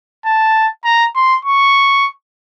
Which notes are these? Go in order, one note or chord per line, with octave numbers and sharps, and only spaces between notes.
A5
A#5
C6
C#6